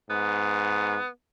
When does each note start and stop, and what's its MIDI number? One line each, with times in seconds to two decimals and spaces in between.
0.10 0.97 44
0.10 1.07 59